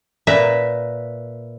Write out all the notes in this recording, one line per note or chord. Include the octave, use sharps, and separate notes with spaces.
A#2 B4 E5 A#5